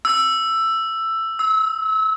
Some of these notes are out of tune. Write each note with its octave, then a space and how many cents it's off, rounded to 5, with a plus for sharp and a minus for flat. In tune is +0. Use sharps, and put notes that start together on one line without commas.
E6 +10
E6 -30